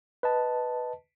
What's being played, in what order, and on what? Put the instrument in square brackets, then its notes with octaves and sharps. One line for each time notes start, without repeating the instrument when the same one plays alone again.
[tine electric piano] B4 D#5 A5